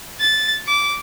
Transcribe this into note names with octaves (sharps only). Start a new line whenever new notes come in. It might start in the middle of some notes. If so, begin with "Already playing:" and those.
A6
D6